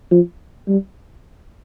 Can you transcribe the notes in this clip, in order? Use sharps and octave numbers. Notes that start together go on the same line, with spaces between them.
F3
G3